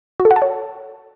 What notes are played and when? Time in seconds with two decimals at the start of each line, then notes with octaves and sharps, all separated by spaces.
0.20 F#4
0.25 A4
0.31 F#5
0.36 A5
0.42 C#5